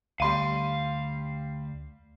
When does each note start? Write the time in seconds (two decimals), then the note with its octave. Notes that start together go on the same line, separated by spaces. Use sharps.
0.20 D2 G3 F5 C6 D#7